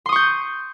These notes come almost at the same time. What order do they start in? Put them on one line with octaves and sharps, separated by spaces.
C6 D#6 C#6 G6